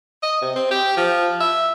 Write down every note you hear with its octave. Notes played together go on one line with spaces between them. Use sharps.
D#5
C3
C4
G4
F3
E5